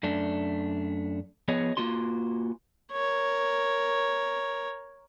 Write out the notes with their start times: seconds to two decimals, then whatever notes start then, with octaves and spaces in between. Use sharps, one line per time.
0.03 F#2 A3 D4
1.48 F3 B3 G#4 C#5 D#5
1.77 A#3 F4 F#4 C6
2.92 A#4 C#5